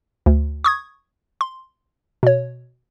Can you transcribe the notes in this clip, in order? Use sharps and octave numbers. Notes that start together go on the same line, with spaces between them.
D2
C#6 D#6 G#6
C6
B2 C#5